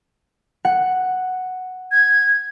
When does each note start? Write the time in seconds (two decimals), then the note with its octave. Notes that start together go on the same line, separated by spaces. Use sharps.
0.65 F#5
1.92 G#6